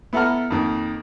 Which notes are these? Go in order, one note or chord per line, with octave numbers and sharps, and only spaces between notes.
B3 E4 A4 F#5 A#5 F6
F2 D#3 A#3